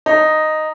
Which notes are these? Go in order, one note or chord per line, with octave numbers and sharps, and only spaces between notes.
D#4